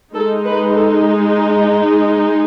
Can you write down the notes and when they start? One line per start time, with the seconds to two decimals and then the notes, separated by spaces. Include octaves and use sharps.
0.14 G#3 D#4 A4
0.46 B4
0.76 A4